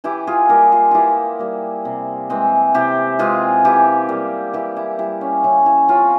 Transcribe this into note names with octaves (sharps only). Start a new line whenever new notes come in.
E3 E4 G4
F4 G#4
G3 A#3 G4 A#4
F4 G#4
E3 E4 F4 G4
G3 A#3
C3
E3 G#3 C4
C3 E4 G4
E3 G#3 C4 F4 G#4
E3 E4 G4
G3 A#3
E3 E4 G4
E4
G3 A#3 E4
C#4
C#3 E4
E4
F3 C4 C#4 F4